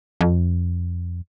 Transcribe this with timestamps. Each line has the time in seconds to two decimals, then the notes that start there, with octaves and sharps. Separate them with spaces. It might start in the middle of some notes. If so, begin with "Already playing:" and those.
0.21 F2